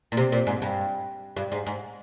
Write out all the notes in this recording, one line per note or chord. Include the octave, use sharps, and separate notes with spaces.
A#2
C3
A#2
G#2
G2
G2
G#2
G#2